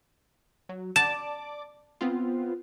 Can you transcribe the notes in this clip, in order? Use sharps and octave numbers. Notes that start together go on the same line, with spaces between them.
F#3
D5 A5 D6
B3 C4 F4